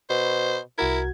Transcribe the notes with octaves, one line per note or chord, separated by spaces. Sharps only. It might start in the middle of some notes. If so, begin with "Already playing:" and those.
B2 C5
C2 E4 F#4 A#4 G#6